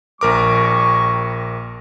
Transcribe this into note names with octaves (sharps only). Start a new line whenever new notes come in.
A#1 G3 A#4 G#5 C#6 D6